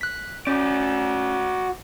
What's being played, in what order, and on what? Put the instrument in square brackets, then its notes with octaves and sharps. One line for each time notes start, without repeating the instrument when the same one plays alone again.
[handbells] F#6 B6
[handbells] C#4 [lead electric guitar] F#4 D5